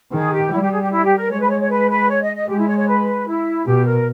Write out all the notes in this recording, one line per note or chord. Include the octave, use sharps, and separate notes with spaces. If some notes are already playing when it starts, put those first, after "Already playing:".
D#3 G#4
G4
G3 E4
G4
G#4
G4
E4
G4
A#4
G#3 C#5
B4
C#5
C#5
B4
B4
C#5
D#5
D#5
G#3 G4
E4
C#5
C#5
B4
E4
B2 G4
A#4